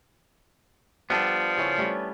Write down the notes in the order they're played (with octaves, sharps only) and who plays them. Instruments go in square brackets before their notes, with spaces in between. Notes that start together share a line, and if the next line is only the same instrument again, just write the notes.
[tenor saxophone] F3 [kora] G3 A4 G5 [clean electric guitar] B3 D4
[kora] C#3 C#4 E4
G3 A3 C#4